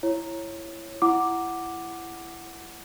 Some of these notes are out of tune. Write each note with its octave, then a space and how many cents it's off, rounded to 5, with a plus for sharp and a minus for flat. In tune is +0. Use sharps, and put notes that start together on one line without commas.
E4 +20 C#5 -10
E4 +20 F#5 +0 D6 +0